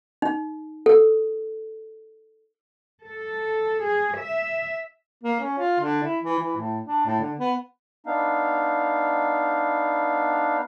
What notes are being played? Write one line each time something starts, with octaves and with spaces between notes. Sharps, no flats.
D#4
A4
A4
G#4
E5
A#3
C#4
F4
D3
E4
E3
E3
A2
D4
A2
D3
B3
B3 D4 D#4 F5